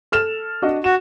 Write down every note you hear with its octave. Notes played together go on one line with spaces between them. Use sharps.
A4 F6 E7
D4 F#4 D#5
F#4 E7